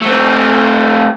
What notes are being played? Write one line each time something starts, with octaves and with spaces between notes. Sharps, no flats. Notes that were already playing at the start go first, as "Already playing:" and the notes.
A3 C4